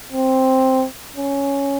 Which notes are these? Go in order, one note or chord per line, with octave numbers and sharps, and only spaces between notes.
C4
C#4